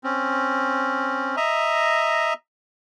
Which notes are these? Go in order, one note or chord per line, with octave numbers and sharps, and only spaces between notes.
C4 C#4
D#5 E5 A#5